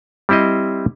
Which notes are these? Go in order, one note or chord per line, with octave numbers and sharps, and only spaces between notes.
G3 C4 E4 C5 D#5